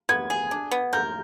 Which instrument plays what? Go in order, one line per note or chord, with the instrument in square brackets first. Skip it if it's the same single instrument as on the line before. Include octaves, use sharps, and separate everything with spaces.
[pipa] B3 [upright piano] G#6
[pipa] G#4
D4
B3
[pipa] A#4 [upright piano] G6